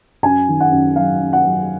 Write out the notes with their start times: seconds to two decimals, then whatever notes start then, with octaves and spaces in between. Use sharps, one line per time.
0.23 F#2 G#5
0.48 D#3
0.60 F#5
0.71 F#2
0.96 F#3 F5
1.20 F#2
1.33 F#5
1.45 F#3